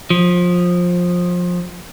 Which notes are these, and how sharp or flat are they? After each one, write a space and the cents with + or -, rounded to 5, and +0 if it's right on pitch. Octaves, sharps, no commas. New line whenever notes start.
F3 +20